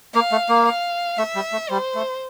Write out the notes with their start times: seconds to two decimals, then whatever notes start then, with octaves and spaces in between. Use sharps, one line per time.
0.14 A#3 F5
0.32 A3
0.49 A#3
0.66 F5
1.18 A3 E5
1.35 G3
1.52 A3
1.69 G3 C5
1.95 A3